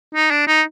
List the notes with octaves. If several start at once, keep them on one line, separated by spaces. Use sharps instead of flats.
D#4
D4
D#4